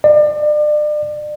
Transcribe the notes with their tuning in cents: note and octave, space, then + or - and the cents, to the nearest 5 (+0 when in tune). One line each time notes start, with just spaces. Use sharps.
D5 +35